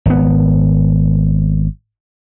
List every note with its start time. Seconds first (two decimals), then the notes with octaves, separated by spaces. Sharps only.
0.06 G#1 B3